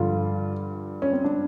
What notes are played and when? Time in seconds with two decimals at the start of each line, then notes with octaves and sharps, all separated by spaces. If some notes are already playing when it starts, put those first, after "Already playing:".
Already playing: G2 D3 F3 F4
1.02 C#4
1.13 C4
1.24 D4